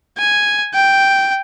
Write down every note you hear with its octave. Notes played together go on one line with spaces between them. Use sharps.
G#5
G5